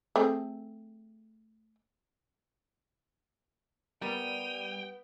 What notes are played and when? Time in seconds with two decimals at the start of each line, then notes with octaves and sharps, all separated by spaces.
0.16 A3 C4 G#4
4.02 G3 B3 A#4 G5 D#7 F7